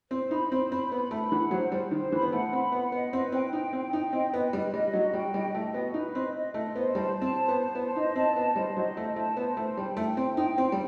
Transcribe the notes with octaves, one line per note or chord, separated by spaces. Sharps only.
C4 C5
D#4 B5
C4 C5
C4 B5
B3 B5
A3 B5
E3 F#5
F#3 C5
G3 C5
D#3 C5
E3 B5
B3
A3 F#5
C4 B5
B3 F#5
B3 D#5
C4 B4
C4 G5
D#4 G5
C4 G5
D#4 G5
C4 D#5
B3 B4
G3 D#5
G3 D#5
F#3 F#4
G3 G5
G3 D#5
A3 D#5
B3 F#4
D#4 B4
C4 D#5
D#5
A3 D#5
B3 C5
G3 A5
A5
C4
C5
B3
A5
B3 C5
D#4 D#5
C4 A5
B3 D#5
G3 C5
F#3 D#5
A3 C5
A3 A5
B3 C5
A3 C5
G3 G5
A3 G5
C4 C5
D#4 G5
C4 G5
G3